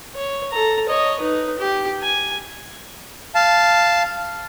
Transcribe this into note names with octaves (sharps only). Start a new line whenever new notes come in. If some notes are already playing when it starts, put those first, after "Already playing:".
C#5
A4 A#5
C#5 D#5
D#4 B4
G4
G#5
F5 A5